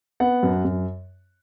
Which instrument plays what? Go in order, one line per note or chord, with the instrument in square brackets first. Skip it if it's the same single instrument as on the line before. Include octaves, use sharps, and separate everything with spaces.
[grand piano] B3 F#5
F#2
F#2